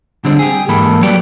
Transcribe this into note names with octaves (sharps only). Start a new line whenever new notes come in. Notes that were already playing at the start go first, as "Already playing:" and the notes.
D3 G3 G#3 C4 D4
G4 G#4
G#2 E3 A#3 A4 B5
F#3 G3 F#4 G4 B4 D5